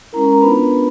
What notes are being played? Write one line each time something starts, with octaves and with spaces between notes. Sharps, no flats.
G#3 C#4 E4 A#4 A#5
A#4 A#5
B3 D4 F4 B4 B5